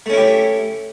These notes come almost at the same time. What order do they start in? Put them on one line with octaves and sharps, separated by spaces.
A3 C#4 E4 G4